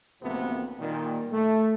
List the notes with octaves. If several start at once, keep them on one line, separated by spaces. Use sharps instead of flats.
A1 D2 C3 F3 A#3 B3
A#2 D#3 G3
A3